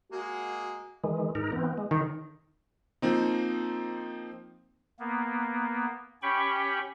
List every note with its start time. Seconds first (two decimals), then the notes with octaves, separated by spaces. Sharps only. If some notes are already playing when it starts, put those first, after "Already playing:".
0.12 G#3 A#3 F#4
1.04 D#3 E3 G#3
1.35 G#2 D#4 A#4
1.52 E3 B3 C4
1.78 G#3
1.91 D#3 D#4
3.02 F3 A#3 C4 D#4
4.99 A#3 B3
6.22 C#4 G4 G5 B5 C#6